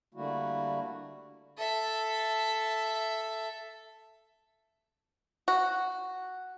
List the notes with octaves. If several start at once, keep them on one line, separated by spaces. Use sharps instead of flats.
D3 G3 A3 A#3 E4 F#4
A4 E5
F#4